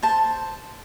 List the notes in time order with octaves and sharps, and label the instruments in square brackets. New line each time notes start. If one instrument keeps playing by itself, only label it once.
[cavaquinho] C5 A5